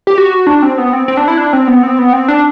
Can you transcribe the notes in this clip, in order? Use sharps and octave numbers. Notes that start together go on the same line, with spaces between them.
G4
F#4
D4
C4
B3
C4
C4
D4
E4
D4
C4
B3
C4
B3
C4
D4